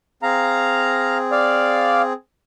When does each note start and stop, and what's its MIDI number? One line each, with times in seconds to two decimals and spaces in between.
0.23 2.13 60
0.23 2.13 68
0.23 1.18 77
0.23 1.18 82
1.32 2.02 74
1.32 2.02 77